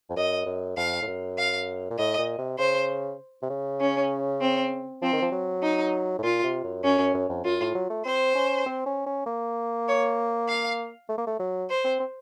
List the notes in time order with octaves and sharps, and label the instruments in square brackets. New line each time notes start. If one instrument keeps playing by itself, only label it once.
[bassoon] F2
[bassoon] F#2 [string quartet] D#5
[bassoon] F#2
[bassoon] F2 [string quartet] F5
[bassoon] A2
F#2
[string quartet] F5
[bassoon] A#2
[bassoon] A2 [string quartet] D#5
[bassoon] A#2
C3
[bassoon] C#3 [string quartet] C5
[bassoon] C3
C#3
[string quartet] C#4
C4
[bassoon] F3 [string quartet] C4
[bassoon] D#3
F3
F#3
[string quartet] D#4
[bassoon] A2
[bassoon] A#2 [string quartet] F4
[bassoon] C3
F#2
[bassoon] F#2 [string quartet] C#4
[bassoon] F#2
F#2
F2
[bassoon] F#2 [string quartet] F4
[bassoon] A2
F#3
A3
[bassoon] C4 [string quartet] C5
[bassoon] C#4
C4
C#4
C#4
A#3
[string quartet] C#5
F5
[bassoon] A3
A#3
A3
F#3
[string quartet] C5
[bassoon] C4
C4